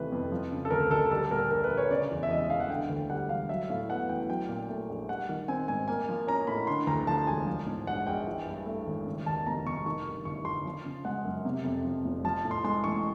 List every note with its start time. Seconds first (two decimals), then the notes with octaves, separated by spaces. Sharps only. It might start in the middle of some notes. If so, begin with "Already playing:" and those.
Already playing: D#2 C3 E3 A3 B4
0.12 F2
0.32 F3
0.52 C#3
0.65 A4
0.71 D2 A#4
0.90 D2 A4
1.11 G3 A4
1.31 A#2 A#4
1.50 A#1 A#4
1.64 B4
1.71 A#1
1.77 C#5
1.91 C#3 D5
2.11 E2
2.23 E5
2.30 E1 D#5
2.40 E5
2.49 E1 F5
2.60 F#5
2.69 D3 G5
2.90 D2
3.10 G3 F#5
3.29 E1 F5
3.49 F#3 E5
3.70 A2 F5
3.89 B3 F#5
4.09 A1 G5
4.29 F#3 G5
4.49 A#2
4.69 A3
4.89 A#1
5.09 G3 F#5
5.29 D#3
5.48 C4 G#5
5.68 G#2 G#5
5.88 A#3 G#5
6.09 F3
6.27 C#4 A#5
6.47 A2 B5
6.67 D3 C6
6.87 D2 A#5
7.07 F3 A5
7.27 E1 G#5
7.47 F3
7.67 G#2
7.87 A#1 F#5
8.07 A#1 G5
8.27 E3
8.47 G2
8.66 A3
8.86 G#1
9.06 C#3
9.26 D#2 A5
9.46 F1 A#5
9.66 F1 C#6
9.86 D#3 C#6
10.06 G2
10.25 G1 C#6
10.45 G1 C6
10.65 F3
10.85 C#3
11.05 G#3 F#5
11.24 F#2
11.45 C3
11.64 F2
11.84 F3
12.05 F1
12.24 F3 A5
12.45 A2
12.51 C6
12.64 G#3 C6
12.84 A1 C#6